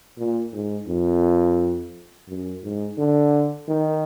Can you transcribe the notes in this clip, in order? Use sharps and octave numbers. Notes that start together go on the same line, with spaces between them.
A#2
G#2
F2
F#2
G#2
D3
D#3